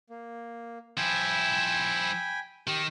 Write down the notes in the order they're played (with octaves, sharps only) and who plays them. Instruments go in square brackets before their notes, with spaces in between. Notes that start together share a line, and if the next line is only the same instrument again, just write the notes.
[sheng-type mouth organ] A#3
[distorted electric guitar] F3 E4 [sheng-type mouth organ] G5 G#5 B5
[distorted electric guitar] D#3 [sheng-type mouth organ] G4